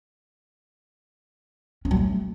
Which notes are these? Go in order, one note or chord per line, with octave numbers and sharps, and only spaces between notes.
C#4
F#3
A3